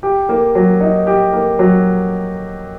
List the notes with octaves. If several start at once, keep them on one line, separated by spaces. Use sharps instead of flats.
G4
A#3
F#3
D#4
G4
A#3
F#3